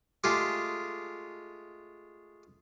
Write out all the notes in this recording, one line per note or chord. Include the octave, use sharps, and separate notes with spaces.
G#3 A3 F4 G4 G#4